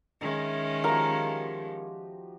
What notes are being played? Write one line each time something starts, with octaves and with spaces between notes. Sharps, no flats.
D#3 G#3 C#4 D#4 E5
F3 F#4 G4 A#4 A#5